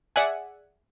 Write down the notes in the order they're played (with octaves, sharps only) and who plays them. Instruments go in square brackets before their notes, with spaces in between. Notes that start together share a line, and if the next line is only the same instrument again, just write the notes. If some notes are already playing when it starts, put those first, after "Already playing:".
[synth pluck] G#4 D5 E5 F#5 G#5